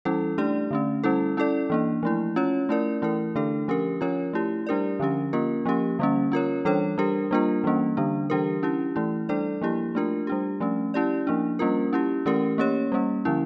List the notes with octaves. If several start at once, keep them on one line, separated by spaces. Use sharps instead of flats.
E3 G3 C#4 E4 A4
A3 D4 G4 D5
D3 A3 C#4
G3 C#4 E4 A4
C#4 E4 A4 D5
E3 A#3 D4
F3 A3 E4
C#4 F4 C#5
A3 C#4 E4 A#4 D5
E3 A3 E4 A#4
D3 A3 D4 A4
F3 C#4 G4 A#4
F3 C#4 F4 A#4 C#5
A3 E4 G4
G3 D4 G4 A#4 D5
D3 F3 C#4 G4
A#3 C#4 F4 A#4
F3 A#3 C#4 G4
D3 G3 A#3 C#4
C#4 F4 A#4 C#5
E3 G3 D4 A4 C#5
G3 D4 G4 A#4
G3 A#3 D4 F4 A#4
E3 G3 A#3 C#4
D3 G3 D4
E3 G3 D4 G4 A#4
C#4 E4 G4
E3 A3 E4
G3 D4 A4 D5
F3 A#3 E4 G4
A3 D4 F4 A#4
G3 D4 G4
F3 A3 C#4
C#4 E4 G4 D5
F3 A#3 D4
G3 A#3 C#4 F4 A#4
C#4 E4 G4
E3 A3 C#4 G4 A#4
A#3 C#4 G4 C#5
G3 A#3 C#4
D3 F3 C#4 E4